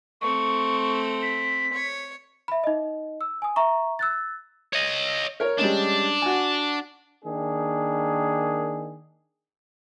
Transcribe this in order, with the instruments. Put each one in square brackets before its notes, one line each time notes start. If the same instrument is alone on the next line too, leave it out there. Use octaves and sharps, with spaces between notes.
[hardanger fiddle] A3 C4 [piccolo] C#6
[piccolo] B6
[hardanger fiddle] C#5
[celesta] E5 B5
D#4 D#5
E6
G#5 D#6
E5 A#5 C#6
E6 F#6 A6
[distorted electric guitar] C#5 D#5
[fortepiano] A#4 C#5
[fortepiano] G3 G#3 C#4 [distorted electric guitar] D4
[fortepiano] F#4 G#5
[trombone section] D#3 A#3 D4 G#4